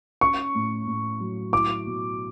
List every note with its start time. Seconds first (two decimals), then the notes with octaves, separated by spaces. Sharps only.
0.21 C#4 C#6
0.55 A2
0.87 A2
1.20 F#3
1.53 E4 D6
1.86 B2